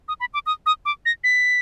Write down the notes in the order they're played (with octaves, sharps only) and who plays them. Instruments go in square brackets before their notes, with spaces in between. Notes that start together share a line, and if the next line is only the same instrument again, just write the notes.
[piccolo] D#6
B5
D6
D#6
D#6
D6
A#6
B6